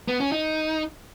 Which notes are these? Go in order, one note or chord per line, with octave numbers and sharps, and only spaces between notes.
B3
C#4
D#4